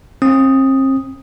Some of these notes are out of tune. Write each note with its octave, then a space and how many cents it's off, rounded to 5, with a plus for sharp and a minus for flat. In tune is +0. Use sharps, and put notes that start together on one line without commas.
C4 +40 D#6 +0